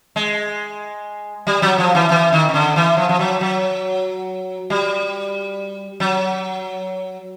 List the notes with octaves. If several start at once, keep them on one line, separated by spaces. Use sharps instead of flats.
G#3
G3
F#3
F3
E3
E3
D#3
D#3
D3
E3
F3
F3
F#3
F#3
G3
F#3